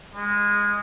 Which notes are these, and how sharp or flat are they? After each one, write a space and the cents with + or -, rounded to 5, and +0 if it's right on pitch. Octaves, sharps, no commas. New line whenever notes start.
G#3 -15